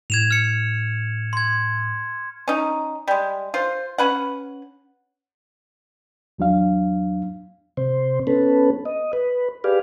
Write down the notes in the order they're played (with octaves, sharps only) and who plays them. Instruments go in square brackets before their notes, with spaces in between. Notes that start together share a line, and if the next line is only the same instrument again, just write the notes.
[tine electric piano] A2 [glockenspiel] G#6 E7 F7
[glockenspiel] F6 C#7
C6 G#6
[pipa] C#4 D#4
G3 G#3
F4 C5
C#4 B4 F#5
[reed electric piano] E2 F#3 D4 F5
[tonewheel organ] C3 C5
B3 C#4 A4 B4
D#5
B4
G4 G#4 B4 D5 F5